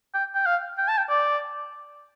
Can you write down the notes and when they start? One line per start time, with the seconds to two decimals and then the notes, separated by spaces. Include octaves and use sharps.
0.14 G5
0.35 G5
0.46 F5
0.78 G5
0.88 A5
0.97 G5
1.09 D5